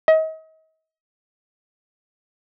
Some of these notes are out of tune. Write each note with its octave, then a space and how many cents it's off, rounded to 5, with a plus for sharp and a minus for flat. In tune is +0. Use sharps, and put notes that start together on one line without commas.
D#5 +40